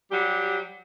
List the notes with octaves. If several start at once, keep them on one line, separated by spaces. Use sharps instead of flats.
F#3 G3 G4